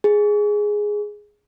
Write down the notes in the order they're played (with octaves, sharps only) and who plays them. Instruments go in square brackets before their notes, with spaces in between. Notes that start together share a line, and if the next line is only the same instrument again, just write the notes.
[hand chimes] G#4